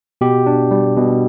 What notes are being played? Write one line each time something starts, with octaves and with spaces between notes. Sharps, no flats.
B2 G4
D4
G3
B2